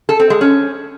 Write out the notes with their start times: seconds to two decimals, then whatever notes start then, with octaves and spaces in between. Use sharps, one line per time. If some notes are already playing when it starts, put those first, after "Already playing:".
0.09 A4
0.20 C4
0.30 G#3
0.41 C#4